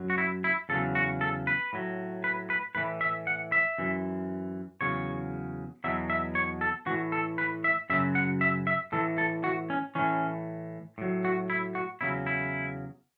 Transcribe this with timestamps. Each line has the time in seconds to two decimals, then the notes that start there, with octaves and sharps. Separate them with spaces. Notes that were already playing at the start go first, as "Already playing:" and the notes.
Already playing: F#2 F#3
0.10 F#4
0.18 E4
0.44 E4
0.69 E2 C#3 F#3 A4
0.95 F#4
1.21 A4
1.47 B4
1.73 A2 F#3
2.24 B4
2.50 B4
2.75 A2 E3 B4
3.01 E5
3.27 F#5
3.52 E5
3.78 F#2 E3
4.81 E2 C#3 F#3 C#5
5.84 E2 B2 F#3 E5
6.10 E5
6.35 C#5
6.61 A4
6.86 A2 E3 F#4
7.12 A4
7.38 B4
7.64 E5
7.90 F#2 C#3 F#3 E5
8.15 F#5
8.41 E5
8.67 E5
8.92 A2 E3 A4
9.18 A4
9.44 F#4
9.70 C#4
9.95 A2 E3 C#4
10.98 A2 F#3
11.25 F#4
11.50 E4
11.75 F#4
12.01 E2 C#3 F#3 E4
12.26 E4